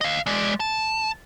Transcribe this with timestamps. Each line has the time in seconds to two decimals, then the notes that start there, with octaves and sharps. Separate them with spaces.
0.01 D#5 F5
0.26 G#3 D5
0.60 A5